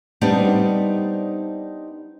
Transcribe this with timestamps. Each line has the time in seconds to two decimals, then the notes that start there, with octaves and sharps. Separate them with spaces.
0.21 G3 B3 C4 D4 D#4 G4